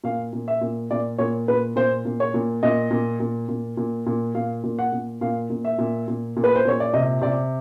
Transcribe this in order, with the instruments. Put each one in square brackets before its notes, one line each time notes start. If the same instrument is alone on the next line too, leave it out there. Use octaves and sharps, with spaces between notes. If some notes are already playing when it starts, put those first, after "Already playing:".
[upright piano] A#2 F5
A#2
E5
A#2
A#2 D5
A#2 C#5
A#2 B4
A#2 C5
A#2
C#5
A#2
A#2 D#5
A#2
A#2
A#2
A#2
A#2
A#2 F5
A#2
F#5
A#2
A#2 F5
A#2
E5
A#2
A#2
A#2
B4
C5
A#2 C#5
D5
C3 D#5
C3 D5